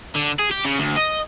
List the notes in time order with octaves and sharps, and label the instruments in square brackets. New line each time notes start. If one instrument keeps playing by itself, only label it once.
[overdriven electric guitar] D3
G#4
G4
C#3
D2
D#5